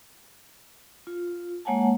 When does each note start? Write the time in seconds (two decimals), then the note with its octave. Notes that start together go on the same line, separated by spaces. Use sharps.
1.07 F4
1.65 G#3 A#3 C#5 F#5 G#5 A5